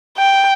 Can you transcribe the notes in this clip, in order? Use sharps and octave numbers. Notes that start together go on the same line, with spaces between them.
G5